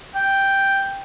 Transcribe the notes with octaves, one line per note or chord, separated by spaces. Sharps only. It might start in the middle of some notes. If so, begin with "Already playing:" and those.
G5